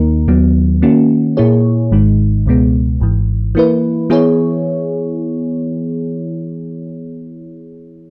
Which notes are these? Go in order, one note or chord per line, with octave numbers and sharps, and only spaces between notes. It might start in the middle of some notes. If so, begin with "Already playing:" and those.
Already playing: D#2 D#3 A#3 D#4 A#4
D#2 D#3 F#3 B3
D#3 A#3 C#4 F#4
A#2 A#3 E4 G#4 C#5
G#1 G#2 D#3 G#3 D#4
C#2 B2 G#3 B3
G#1 G#2 E3
E3 A#3 E4 B4
E3 B3 E4 G#4 C#5